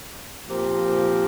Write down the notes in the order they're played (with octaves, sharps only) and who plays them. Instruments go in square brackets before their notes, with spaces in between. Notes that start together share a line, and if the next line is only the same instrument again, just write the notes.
[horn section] A#2 F3 C4 G4 A#4